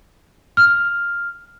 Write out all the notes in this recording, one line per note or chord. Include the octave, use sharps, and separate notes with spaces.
F6